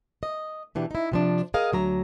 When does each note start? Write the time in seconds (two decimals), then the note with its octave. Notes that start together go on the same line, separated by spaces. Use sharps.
0.23 D#5
0.75 B2 E3 D4 G4
0.91 D#4 E4
1.12 C3 F3 D4
1.54 G#4 A#4 D#5 F5
1.73 D2 F#3 A#5